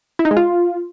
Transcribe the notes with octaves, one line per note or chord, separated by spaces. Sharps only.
E4
D#4
G#3
F4